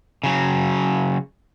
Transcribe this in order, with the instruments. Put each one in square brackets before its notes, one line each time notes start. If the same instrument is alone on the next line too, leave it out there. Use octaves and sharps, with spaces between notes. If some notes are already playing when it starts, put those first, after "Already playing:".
[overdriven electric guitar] C#3 F#3